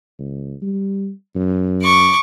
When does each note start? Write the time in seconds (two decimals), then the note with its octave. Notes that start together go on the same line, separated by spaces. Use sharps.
0.19 C#2
0.62 G3
1.36 F#2
1.82 C#6 D6